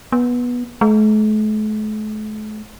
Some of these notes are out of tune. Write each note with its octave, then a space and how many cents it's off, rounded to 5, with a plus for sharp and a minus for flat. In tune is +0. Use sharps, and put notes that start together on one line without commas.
B3 -15
A3 -45